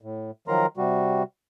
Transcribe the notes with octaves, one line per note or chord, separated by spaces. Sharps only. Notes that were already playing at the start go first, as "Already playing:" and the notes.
A2
D#3 F3 F#3 A#4 A#5 C6
C3 G3 F#4